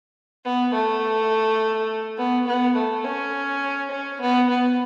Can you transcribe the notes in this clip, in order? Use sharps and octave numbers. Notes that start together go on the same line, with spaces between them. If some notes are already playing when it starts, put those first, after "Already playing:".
B3
A3
B3
B3
A3
C#4
C#4
B3
B3